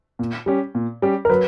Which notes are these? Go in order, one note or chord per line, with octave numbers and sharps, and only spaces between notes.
A#2
G3 C#4 G4
A#2
G3 C#4 G4
A#4
F#3 B4